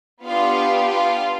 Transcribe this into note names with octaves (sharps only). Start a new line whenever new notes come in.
B3 D4 F4 G4 F5
F4 F5